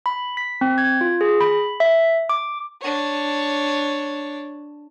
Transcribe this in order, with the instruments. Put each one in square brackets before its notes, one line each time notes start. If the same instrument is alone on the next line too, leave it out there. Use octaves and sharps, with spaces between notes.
[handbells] B5
B6
C4
G#6
F4
G#4
B5
E5
D6
[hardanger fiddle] D4 C#5